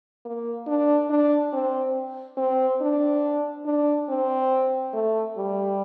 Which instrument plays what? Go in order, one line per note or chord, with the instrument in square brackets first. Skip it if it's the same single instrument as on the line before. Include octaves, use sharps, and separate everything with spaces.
[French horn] A#3
D4
D4
C4
C4
D4
D4
C4
A3
G3